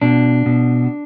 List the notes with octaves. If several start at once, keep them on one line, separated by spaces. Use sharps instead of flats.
B2 D4
B2